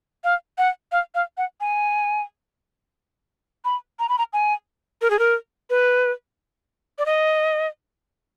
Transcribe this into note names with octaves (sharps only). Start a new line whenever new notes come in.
F5
F#5
F5
F5
F#5
G#5
B5
A#5
B5
A#5
G#5
A#4
G#4
A#4
B4
D5
D#5